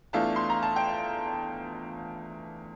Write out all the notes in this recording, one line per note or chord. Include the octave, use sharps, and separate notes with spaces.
E2 E3 A3 D4 F4 A5
C6
A#5
A5
G5